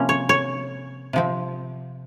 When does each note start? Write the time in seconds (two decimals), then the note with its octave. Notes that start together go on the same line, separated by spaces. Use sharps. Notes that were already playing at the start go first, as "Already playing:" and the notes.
Already playing: C3 F3 A#3 C#4
0.09 C#5
0.29 C#5
1.13 C3 F3 C4